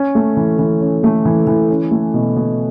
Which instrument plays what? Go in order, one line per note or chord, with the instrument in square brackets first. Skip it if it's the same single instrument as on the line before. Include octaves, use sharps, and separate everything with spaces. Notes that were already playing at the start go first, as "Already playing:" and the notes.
Already playing: [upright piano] C#4
A3
E3
E3
C#4
A3
E3
E3
C#4
A3
B2
B2